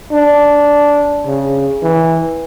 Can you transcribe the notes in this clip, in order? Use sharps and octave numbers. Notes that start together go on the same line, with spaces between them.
D4
C#3
E3